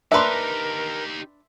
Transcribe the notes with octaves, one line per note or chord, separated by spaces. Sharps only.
D4 D#4 G4 A#4 B4 E5 C6